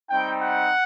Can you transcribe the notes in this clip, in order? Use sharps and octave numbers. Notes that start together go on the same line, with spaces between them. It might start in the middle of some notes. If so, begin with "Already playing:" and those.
G3 C4 D#4 G5
F#5